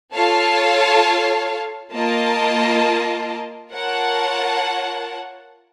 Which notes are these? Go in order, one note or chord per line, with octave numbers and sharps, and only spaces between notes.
F4 A4 C#5 F5 A5
A#3 F4 A#4 D#5 A5
F4 A#4 C#5 F#5 A5